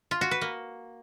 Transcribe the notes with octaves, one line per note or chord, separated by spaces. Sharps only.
F4
F#4
B4
A#3